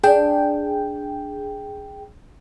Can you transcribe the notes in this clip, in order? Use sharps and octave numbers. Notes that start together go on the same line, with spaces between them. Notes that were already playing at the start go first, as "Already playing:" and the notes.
D4 G#4 G5